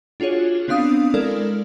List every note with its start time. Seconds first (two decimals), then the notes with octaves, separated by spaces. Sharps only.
0.20 D4 F4 F#4 G#4 C#5
0.68 B3 C4 D4 F5 D#6
1.14 G#3 E4 A4 A#4 D5 F6